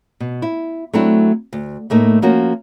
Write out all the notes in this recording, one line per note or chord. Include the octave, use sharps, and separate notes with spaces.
B2
E4
F#3 A3 C4 D4 E4
D2
A2 A3 A#3 D#4
F3 A#3 C#4 F#4 A#4